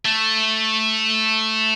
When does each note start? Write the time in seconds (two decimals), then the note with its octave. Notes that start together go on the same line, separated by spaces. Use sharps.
0.06 A3